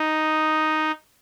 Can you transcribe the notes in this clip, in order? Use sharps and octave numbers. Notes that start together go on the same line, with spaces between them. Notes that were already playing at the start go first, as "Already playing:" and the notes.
Already playing: D#4